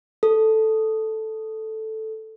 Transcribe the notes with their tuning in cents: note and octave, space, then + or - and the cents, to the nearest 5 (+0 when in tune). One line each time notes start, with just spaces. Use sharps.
A4 +0